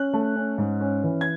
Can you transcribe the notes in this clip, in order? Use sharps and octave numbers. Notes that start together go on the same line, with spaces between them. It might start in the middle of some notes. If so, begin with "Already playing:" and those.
Already playing: C#4 F#6
A3
C#4
G#2
C#4
E3
G#6